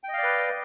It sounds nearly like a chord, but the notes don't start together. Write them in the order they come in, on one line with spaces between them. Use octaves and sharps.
G5 D#5 F5 D5 B4